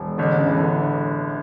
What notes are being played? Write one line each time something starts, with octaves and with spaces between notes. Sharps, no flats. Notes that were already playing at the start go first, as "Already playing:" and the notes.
Already playing: E1
A1 D3
C#3
E3
D3